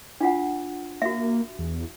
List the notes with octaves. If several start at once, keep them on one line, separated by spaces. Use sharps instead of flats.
D4 F4 F#5
A#3 F#4 E5
E2